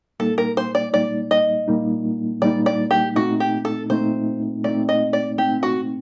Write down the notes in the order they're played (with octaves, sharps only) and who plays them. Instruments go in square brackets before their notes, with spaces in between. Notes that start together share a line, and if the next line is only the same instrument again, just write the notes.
[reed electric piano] A#2 G3 A#3 D#4 [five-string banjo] A4
[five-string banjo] A#4
C5
D5
[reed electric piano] A#2 G3 A#3 D#4 [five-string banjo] D5
[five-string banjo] D#5
[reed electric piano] A#2 G3 A#3 D#4
[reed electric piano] A#2 G3 A#3 D#4 [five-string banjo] D5
[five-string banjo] D5
G4
[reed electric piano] A#2 A3 C4 D#4 [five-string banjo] F#4
[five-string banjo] G4
A4
[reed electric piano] A#2 A3 C4 D#4 [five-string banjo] C5
[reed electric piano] A#2 A3 C4 D#4 [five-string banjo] D5
[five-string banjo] D#5
D5
[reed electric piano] A#2 A3 C4 D#4 [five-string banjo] G4
[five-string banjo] F#4